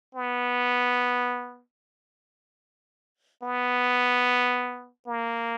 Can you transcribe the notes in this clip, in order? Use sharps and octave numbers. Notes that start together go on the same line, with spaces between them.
B3
B3
A#3